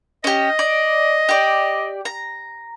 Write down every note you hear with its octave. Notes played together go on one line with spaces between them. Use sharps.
C#4 G4 D#5
D5
G4 D5
A#5